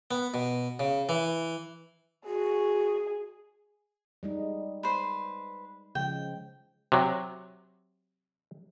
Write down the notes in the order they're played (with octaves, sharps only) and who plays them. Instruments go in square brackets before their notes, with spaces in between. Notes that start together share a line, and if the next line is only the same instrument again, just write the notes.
[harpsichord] B3
B2
C#3
E3
[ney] F#4 [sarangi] G#4
[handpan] G3 G#3 D#4
[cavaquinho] B4 C5
[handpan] C#3 F3 G#3 [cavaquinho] G5
[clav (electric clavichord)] C3 F#3